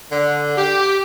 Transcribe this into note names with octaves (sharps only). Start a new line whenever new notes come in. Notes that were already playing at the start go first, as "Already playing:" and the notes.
D3
G4